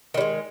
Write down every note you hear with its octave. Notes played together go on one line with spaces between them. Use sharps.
D#3 G3 G#3